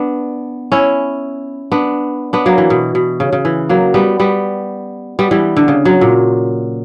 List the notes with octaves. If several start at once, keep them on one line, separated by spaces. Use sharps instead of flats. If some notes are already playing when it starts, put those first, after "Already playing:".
Already playing: B3 D4
C#4 E4
B3 D4
B3 D4
F#3 A#3
E3
B2
B2
C#3
C#3
E3
F#3 A#3
G3 B3
G3 B3
G3 B3
E3 G3
D3
C#3
F#3
A#2